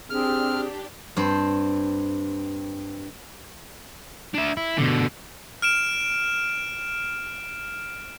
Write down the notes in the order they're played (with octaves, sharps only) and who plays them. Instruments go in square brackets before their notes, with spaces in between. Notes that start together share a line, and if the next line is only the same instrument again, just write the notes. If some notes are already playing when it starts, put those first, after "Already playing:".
[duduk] C4 [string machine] D4 G4 [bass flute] G#4 [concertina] F6
[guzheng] G2 C4 C5
[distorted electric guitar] D4 E5
E4
B2 D3
[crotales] F6 D7 E7